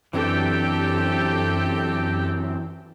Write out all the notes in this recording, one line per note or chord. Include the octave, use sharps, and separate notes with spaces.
F#2 E3 C4 D4 G4 A4 G5